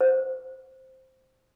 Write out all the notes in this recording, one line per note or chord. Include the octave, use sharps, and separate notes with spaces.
C5